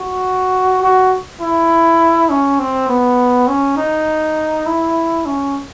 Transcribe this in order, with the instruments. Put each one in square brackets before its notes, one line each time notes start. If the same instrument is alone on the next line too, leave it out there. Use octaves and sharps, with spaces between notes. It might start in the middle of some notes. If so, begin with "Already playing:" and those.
Already playing: [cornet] F#4
F#4
E4
C#4
C4
B3
C#4
D#4
E4
C#4